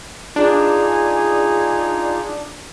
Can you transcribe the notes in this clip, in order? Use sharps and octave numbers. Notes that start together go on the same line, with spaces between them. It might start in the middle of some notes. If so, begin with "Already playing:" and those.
D4 D#4 F4 G#4